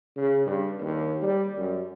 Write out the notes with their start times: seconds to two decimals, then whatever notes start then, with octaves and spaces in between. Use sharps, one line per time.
0.16 C#3
0.46 G2
0.80 D#2
1.22 G3
1.58 F#2